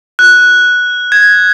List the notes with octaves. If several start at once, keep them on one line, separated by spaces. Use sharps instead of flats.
F#6
G#6